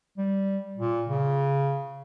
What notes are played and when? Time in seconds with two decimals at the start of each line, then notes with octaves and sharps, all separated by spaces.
0.18 G3
0.77 A#2
1.09 C#3